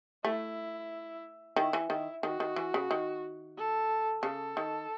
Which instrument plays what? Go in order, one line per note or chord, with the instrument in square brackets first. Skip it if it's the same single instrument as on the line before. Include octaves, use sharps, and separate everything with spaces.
[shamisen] A3 [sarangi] E4
[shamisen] D#3 [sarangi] E4
[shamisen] E3
[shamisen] D#3 [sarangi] E4
[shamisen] D#3 [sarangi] F#4
[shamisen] D#3
E3
C#3
D#3
[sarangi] A4
[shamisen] C#3 [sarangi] A4
[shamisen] D#3